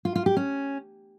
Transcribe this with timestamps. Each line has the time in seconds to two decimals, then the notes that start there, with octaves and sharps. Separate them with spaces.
0.05 F4
0.16 F4
0.26 G4
0.37 C#4